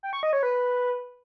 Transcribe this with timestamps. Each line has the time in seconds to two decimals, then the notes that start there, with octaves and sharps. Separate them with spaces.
0.03 G5
0.13 C#6
0.23 D#5
0.33 C#5
0.43 B4